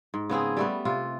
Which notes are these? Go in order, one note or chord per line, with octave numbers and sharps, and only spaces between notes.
G#2
C#3 B3 C4 G#4
G3 A3 B3
C3 F4